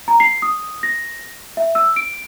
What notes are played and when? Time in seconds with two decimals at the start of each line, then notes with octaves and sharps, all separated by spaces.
0.08 A#5
0.20 C7
0.42 D#6
0.83 A#6
1.57 E5
1.75 E6
1.96 D7